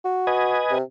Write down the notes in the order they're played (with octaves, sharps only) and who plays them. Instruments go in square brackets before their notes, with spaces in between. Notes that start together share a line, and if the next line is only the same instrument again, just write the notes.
[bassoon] F#4
[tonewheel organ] B4 D#5 G#5
[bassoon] C3